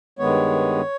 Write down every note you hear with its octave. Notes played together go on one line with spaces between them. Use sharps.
G2 D#3 G#3 B3 C#5